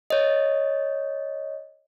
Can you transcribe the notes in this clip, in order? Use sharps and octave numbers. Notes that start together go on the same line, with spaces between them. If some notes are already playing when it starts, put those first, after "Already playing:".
C#5 D#5